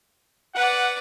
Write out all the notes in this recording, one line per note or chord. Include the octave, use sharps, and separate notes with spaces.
B4 D5 F#5